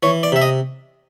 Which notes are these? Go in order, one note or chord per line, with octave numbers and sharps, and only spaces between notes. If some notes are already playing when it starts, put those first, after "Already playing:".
E3 C#5
D5
C3 E5
D#5